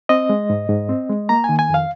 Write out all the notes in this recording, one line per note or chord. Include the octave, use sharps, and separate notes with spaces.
C4 D#5
G#3
G#2
G#2
C4
G#3
A#3 A#5
D#3 G#5
G#5
F2 F5